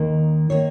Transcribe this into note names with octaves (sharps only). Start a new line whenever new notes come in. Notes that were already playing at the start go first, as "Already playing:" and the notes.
Already playing: D#2 D#3 A#3
D#3 A#3 C#5